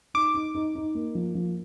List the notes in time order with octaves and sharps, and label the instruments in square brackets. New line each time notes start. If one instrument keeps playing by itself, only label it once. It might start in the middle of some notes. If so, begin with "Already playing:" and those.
[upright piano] D#4 [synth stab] D6
[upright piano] D#4
D#4
D#4
A#3
F3
F3